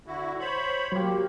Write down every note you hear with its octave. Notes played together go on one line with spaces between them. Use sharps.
D3 E4 F#4
C5 C#5 B5
F#3 A#3 G4